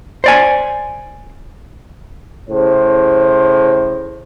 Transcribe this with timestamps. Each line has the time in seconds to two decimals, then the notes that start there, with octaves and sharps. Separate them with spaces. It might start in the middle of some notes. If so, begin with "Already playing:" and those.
0.24 C5 D5 G#5
2.49 A2 C#3 C5